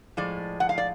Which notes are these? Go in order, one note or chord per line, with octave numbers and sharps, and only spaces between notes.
A2 F3 G#3 D5
F#5
F5
D5